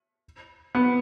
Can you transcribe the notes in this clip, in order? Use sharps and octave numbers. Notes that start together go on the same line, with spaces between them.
B3